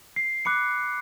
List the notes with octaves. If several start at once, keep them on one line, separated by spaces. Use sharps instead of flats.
C7
B5 D6 F#6 C#7